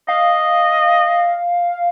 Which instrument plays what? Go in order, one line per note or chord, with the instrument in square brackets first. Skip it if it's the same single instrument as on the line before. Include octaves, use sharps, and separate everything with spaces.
[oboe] D#5 [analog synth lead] F5